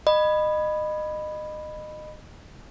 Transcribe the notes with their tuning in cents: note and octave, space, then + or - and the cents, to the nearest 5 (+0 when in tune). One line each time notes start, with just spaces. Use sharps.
D#5 -25 B5 +0